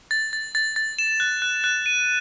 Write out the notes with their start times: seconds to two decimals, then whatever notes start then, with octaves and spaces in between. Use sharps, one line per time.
0.11 A6
0.33 A6
0.55 A6
0.76 A6
0.99 E7
1.20 F#6
1.42 F#6
1.64 F#6
1.86 D#7